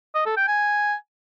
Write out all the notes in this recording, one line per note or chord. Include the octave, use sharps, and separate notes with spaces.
D#5
A4
G5
G#5